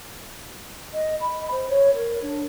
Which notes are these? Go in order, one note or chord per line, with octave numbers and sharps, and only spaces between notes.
D#5
B5
C5
C#5
A#4
D4